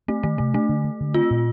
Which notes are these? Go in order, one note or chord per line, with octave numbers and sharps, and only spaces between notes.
A3 C4
D#3 A3
C3 A3
A3 D4
D3
A3
D3
C4 F4
A#2